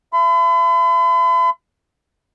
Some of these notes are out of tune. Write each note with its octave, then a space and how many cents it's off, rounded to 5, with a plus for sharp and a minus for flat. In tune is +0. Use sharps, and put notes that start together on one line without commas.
E5 +35 B5 +45